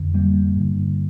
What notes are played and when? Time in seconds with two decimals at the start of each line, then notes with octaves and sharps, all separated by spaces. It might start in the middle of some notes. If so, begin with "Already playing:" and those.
Already playing: F2 D3
0.14 G3 A#3
0.56 G2 D3